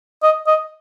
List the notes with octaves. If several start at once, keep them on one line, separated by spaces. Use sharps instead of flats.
D#5
D#5